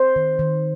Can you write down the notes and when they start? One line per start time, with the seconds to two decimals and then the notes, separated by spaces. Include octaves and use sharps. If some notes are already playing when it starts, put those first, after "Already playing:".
Already playing: C5
0.16 D#3
0.39 D#3